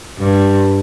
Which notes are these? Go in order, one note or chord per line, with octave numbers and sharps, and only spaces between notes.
G2